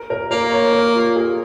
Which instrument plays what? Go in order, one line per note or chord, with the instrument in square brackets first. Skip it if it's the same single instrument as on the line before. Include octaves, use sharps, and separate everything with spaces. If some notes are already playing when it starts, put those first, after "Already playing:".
Already playing: [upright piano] A#4
A#4
[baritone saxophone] A#3 [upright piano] A#4
[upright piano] C#5
A#4
F4
G#4